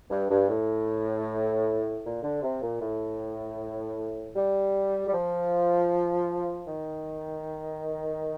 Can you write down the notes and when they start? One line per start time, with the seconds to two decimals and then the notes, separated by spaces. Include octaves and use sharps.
0.10 G2
0.30 G2
0.48 A2
2.04 A#2
2.22 D3
2.42 C3
2.61 A#2
2.80 A2
4.35 G3
5.07 G3
5.12 F3
6.67 D#3